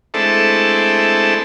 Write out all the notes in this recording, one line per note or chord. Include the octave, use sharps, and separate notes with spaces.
G#3 A3 C4 D4 E4 A4